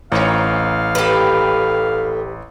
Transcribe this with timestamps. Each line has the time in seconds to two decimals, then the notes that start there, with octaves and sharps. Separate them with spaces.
0.12 A1 C4 D#4 C#5 F5
0.95 A2 G4 A4 B4